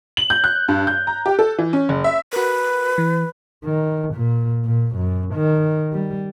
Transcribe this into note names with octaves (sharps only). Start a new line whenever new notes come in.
F#7
G6
F#6
G2
G6
A#5
G4
A4
E3
C#4
F#1
E5
F#4 A#4 B4
E3
D#3
A#2
A#2
F#2
D#3
G3